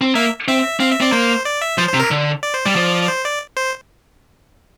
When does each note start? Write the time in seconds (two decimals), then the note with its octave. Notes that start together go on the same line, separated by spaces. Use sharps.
0.01 C4
0.15 A#3 E5
0.48 C4 E5
0.80 C4 F5
0.91 E5
1.01 C4 D5
1.12 A#3 C5
1.45 D5
1.62 E5
1.78 F3 C5
1.89 C3 C5
1.99 A#4
2.11 D3
2.43 D5
2.54 C5
2.65 G3 D5
2.76 F3
3.03 D5
3.08 C5
3.24 D5
3.57 C5